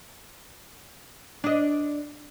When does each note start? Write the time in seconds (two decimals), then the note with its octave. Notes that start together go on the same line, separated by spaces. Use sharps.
1.44 D4 D#5